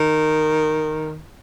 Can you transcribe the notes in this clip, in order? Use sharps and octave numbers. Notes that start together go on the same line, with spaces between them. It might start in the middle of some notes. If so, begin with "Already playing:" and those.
Already playing: D#3